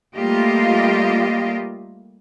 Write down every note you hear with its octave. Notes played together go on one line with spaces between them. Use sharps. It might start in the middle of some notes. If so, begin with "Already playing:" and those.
G3 A3 A#3 F4 G4 D#5